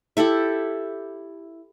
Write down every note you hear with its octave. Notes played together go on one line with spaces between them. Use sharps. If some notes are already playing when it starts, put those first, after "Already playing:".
E4 G4 A4 E5